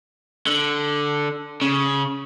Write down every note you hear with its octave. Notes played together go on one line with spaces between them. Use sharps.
D3
C#3